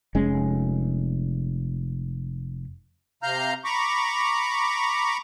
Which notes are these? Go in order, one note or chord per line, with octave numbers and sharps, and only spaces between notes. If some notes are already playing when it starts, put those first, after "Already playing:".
F1 G#3 C#4
C3 F5 A#5 F6 G6
A#5 B5 C#6 D6